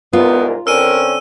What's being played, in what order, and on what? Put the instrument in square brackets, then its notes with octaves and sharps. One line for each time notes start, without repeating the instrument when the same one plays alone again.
[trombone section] C2 G#2 A#4 [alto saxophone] B3 [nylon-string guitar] F4
[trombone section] D3 C4 C#4 [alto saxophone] A#4 [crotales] E6 D#7